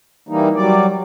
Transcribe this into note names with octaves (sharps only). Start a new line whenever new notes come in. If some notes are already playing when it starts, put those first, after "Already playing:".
E3 G3 A#3 D#4
F#3 G3 D5